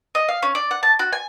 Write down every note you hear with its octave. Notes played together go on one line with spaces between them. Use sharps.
D#5
F5
C#4
D5
F#5
A5
F#4
G#5